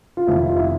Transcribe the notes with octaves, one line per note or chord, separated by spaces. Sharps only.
F4
F1 F2 C3 D#3 E4
F4
E4